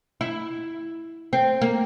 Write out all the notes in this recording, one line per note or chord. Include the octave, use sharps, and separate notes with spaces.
E4
C4
A#3